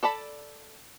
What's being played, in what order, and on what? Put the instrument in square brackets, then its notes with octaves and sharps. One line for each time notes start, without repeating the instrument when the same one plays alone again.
[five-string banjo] A4 D5 A5 B5